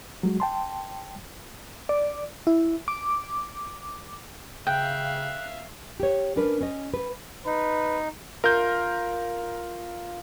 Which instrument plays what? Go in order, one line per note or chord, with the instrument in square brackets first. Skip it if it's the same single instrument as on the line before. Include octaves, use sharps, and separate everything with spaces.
[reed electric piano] F#3 G#3 F#4
G5 A5 C6
[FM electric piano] D5
E4
D6
[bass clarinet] C#3 [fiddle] E5 F5 [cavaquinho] G5 [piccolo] F#6
[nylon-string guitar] G4 C#5
C#4 D4 A#4 B4
C#4 D#5
B4
[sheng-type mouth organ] D#4 [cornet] B4
[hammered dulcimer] F4 [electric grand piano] A#4 G6